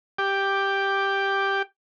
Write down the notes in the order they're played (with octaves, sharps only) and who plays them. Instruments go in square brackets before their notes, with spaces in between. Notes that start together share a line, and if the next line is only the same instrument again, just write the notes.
[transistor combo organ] G4 G5 D6